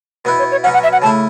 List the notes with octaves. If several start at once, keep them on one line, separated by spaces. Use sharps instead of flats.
B2 B3 E4 B4
C#5
C#5
B2 F#3 C#4 F#5
F#5
E5
F#5
C#3 A3 E4 A5